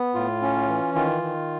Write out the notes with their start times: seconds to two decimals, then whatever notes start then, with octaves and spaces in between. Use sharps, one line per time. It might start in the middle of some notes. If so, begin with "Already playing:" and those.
Already playing: B3
0.15 A2 F4
0.42 C#4
0.68 E3
0.95 D#3 F4
1.22 D#3